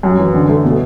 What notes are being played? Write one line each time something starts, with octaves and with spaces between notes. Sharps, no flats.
F#2
E3
D3
A3
B2